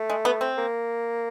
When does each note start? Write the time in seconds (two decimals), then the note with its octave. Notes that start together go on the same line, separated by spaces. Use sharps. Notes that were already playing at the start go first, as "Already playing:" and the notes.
Already playing: A3
0.10 G#3
0.25 B3
0.41 C4
0.57 A#3